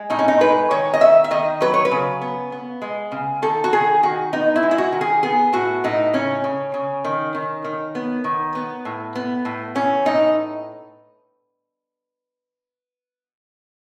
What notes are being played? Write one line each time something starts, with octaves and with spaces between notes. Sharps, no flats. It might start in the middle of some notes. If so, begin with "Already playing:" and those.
Already playing: G#3
A2 D#4
C#4
D#4
G#3 B4
D#3 C#5
D#5
D#3 E5
E5
D#3 D#5
F#3 B4
C#5
B4
C#3
B3
B3
G#3
C#3
D#3 A4
F#4
D#3 G#4
D#3 F#4
B3 D#4
E4
G#3
E4
F#4
D#3
G#4
B3 G#4
A2 F#4
A2 D#4
C#3 C#4
C#3
C#3
D#3
D#3
D#3
B3
D#3
B3
A2
B3
A2
E3 C#4
A2 D#4